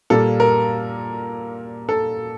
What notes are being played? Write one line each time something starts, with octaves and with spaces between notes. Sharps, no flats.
A#2 G3 A#3 A4
A#4
A4